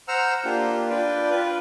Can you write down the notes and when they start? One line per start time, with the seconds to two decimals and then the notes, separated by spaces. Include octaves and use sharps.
0.08 C5 F#5 A#5 E6 F6
0.45 A#3 D4 F4 G4
0.90 D4 F4 B4 D5 G5
1.30 F4 B4